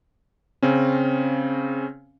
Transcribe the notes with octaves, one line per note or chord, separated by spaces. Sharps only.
C#3 C4 C#4